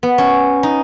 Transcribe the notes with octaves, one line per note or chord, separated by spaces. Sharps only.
B3
C#4
D#4